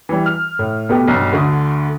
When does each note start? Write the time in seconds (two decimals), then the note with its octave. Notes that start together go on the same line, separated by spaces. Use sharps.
0.09 E3 G3
0.26 F6
0.59 A2
0.89 B2 A3 B3 G4
1.08 B1 G2 B2
1.32 D2 D3 C#6 D#6